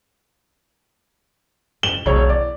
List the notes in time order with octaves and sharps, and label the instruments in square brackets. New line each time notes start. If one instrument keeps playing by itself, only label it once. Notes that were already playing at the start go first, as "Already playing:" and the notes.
[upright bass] F#2 C#4 [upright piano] E7 F#7 G7
[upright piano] E1 C#5 [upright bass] B1 B2
[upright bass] E4 [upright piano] D5